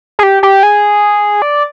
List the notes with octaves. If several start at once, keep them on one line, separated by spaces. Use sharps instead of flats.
G#4
G4
G4
G#4
D5